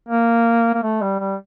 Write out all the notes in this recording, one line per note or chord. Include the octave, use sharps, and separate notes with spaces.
A#3
A#3
A3
G3
G3